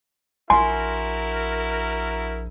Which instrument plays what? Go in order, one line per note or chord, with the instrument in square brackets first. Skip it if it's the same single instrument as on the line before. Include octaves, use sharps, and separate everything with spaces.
[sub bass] A#1 [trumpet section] E4 F#4 A#4 [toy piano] G#5 [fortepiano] C6